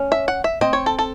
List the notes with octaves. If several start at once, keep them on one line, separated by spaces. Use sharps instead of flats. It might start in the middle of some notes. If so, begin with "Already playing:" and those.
Already playing: C#4
E5
F#5
E5
C4 D#5
C#5
A4
A4